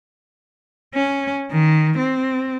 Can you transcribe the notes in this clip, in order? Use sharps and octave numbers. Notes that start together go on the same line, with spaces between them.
C#4
D#3
C4